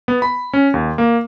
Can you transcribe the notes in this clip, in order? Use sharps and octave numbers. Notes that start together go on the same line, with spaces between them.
B3
B5
C#4
D#2
A#3